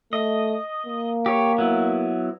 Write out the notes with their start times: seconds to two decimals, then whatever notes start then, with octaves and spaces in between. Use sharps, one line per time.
0.13 A3 D#5
0.86 A#3
1.26 G4 C#5
1.58 F#3 B3 E4